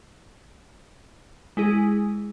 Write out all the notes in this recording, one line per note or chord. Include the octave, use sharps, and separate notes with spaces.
G#3 E4 G#4